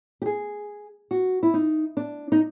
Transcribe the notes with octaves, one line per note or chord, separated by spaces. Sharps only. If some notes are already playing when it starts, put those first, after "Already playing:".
G4
G#4
F#4
E4
D#4
D4
D#4